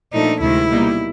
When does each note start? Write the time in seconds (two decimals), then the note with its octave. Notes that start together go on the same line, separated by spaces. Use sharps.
0.12 A#2 F3 A3 D4 D#4
0.41 D2 C3 D#3 G#3 E4
0.70 B2 G3 A#3 D#4